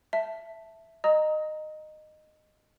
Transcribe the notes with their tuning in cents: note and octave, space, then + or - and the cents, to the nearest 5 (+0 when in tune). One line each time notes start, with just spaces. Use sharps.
E5 +0 A5 +0
D#5 -15 A#5 +0 D#6 +30